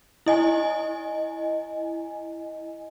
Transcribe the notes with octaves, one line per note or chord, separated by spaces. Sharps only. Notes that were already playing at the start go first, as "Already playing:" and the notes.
E4 D#5 G#5